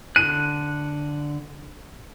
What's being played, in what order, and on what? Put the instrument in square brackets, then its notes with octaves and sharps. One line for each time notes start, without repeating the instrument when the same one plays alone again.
[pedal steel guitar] D3 F#6 [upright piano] D#7